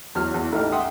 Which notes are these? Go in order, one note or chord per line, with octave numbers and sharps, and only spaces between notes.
E2 F#3 F6
E2
A1 A3 D#4 G4 F6
E5 F#5 G5 C6 D#6